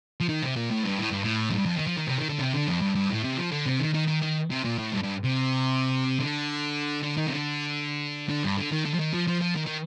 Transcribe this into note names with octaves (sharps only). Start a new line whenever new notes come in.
F3
D#3
C3
A#2
A2
G2
A2
G2
A2
F2
G2
F2
D#3
F3
D#3
C3
D#3
D3
C3
D3
F2
G2
G2
A2
C3
F3
D3
C3
D#3
D#3
D#3
D#3
C3
A#2
A2
G2
G2
C3
D3
D3
D#3
C3
D3
D3
G2
D3
D#3
D3
F3
D#3
F3
F3
F3
D#3
D#3